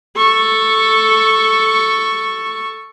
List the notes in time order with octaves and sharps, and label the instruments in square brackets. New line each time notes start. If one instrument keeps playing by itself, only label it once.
[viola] A4 C#6